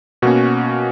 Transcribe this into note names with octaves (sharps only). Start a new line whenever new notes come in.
B2 A#3 C#4 F#4